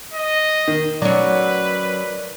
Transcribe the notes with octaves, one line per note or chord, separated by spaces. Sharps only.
D#5
D#3
F#3 C#4 B4 D5